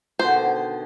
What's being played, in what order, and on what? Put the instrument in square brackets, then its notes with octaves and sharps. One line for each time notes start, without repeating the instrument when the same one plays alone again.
[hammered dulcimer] B2 D3 D#3 [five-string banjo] C5